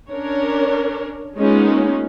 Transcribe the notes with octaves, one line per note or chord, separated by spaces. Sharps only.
C#4 D4 A#4 C#5
G#3 A#3 B3 C#4 D#4 F4